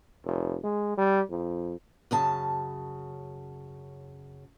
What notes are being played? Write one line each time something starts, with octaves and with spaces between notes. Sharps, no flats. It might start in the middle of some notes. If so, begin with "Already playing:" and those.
F1
G#3
G3
F2
F#2 C#3 A5